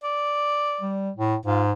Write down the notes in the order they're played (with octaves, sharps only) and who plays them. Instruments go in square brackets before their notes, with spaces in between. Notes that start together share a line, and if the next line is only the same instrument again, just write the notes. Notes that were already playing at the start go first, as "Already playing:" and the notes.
[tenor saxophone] D5
[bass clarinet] G3
A2
[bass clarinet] G#2 [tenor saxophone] F4